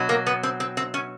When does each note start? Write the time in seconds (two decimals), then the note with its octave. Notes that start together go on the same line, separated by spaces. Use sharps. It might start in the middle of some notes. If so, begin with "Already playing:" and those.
Already playing: B2 F#3
0.09 A#3
0.27 B3
0.43 C4
0.60 C4
0.77 C4
0.94 C#4